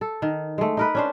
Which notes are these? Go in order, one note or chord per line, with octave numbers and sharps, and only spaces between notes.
A4
D#3
G#3 A3
D#4 A#4 B4
C#4 D4 C5